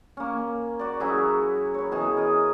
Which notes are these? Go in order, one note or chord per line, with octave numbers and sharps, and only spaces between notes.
A#3 C#4
F#4 D5
F#3 C#4 E4 G#4
C#5 B5
B2 E3 G#4
A#4 D#5